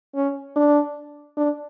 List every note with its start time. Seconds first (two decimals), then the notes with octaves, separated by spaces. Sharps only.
0.15 C#4
0.56 D4
1.37 D4